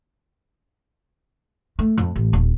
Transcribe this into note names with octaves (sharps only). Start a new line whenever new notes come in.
A3
F2
A1
D#1